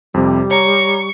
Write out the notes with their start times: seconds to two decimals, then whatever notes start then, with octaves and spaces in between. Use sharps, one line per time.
0.14 F2 C3 G3
0.51 C#5 A#5 C#6